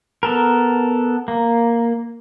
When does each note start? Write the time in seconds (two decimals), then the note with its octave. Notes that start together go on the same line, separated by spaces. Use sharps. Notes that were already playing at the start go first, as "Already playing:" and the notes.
0.23 B3 A4 A#4
1.28 A#3